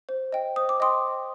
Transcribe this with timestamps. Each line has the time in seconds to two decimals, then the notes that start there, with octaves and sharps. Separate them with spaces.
0.09 C5
0.32 D#5 G5
0.56 C5 D#6
0.69 D6
0.80 D#5 G5 C6 D#6